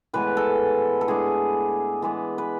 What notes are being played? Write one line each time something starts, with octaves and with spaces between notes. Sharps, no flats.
A2 E3 G#3 B3 B4
A4
A4
A2 G#3 D4 G#4
E3 G#3 B3
B4